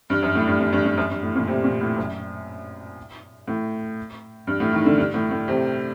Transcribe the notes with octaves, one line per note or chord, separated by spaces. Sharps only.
G2
F#2
A2
G2
G2
G2
G2
F#2
G2
A2
A#2
C3
A#2
A2
F#2
A2
G2
A2
D#3
D3
G2
A2
A2
C3